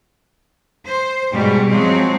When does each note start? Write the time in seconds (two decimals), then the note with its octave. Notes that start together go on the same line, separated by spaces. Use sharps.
0.86 C5
1.32 G#2 B2 G3 G#3
1.68 F3 F#3 G#3 C4